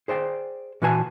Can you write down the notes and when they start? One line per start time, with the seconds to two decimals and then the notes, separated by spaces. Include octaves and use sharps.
0.08 G#4 C5 D5 G5
0.82 A#2 E3 F#4 B4 G#5 A5